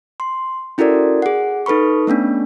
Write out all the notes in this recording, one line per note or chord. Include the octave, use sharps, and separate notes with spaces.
C6
C#4 E4 F#4 A4 A#4 D5
G#4 F#5
D#4 A4 B4 B5 C#6
A3 B3 C#4 D4